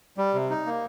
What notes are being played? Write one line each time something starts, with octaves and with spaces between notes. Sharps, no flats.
G3
C3
D#4
A#3